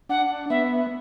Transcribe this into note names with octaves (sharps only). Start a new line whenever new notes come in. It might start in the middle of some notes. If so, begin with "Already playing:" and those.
D4 F#5
B3 E5